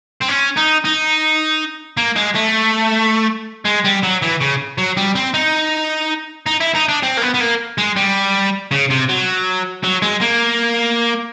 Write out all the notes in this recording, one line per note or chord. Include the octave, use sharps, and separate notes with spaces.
C4
C#4
D#4
D#4
A#3
G#3
A3
G#3
G3
F#3
E3
C#3
F#3
G3
C4
D#4
D#4
E4
D#4
D4
C4
A#3
B3
B3
A#3
G#3
G3
C#3
C3
F#3
F#3
G#3
A#3